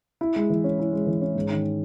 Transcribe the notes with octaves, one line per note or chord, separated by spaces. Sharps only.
E4
G#3
E3
C#4
E4
G#3
E3
C#4
G#2
D#3